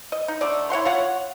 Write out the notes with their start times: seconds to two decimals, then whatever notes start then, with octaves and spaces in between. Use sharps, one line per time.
0.12 D#5
0.28 D#4
0.41 D3 A3 D5
0.70 E4 C#5 F#5 C6
0.85 F4 C#5 F#5